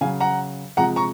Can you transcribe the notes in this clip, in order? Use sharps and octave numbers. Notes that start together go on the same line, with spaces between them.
C#3 F#3 F5 G#5
F#5 A#5
C3 F3 G#3 F#5 A#5
A#5 C#6